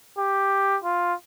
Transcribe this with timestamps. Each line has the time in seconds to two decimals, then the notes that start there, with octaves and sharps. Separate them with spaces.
0.18 G4
0.84 F4